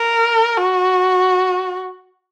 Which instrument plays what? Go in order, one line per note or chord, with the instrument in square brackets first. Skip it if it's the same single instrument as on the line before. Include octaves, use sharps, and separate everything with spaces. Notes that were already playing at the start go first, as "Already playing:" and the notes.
Already playing: [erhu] A#4
F#4